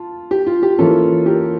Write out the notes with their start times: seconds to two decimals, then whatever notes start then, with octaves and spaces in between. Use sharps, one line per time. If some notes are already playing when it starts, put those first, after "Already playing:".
Already playing: F4 A5
0.31 G4
0.47 F4
0.63 G4
0.79 E3 A#3 C#4 F4 A4
1.26 G4 A#4